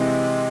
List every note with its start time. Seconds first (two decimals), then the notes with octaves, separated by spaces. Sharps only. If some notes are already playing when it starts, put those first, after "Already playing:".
Already playing: C3 E3 G#3 C4 E4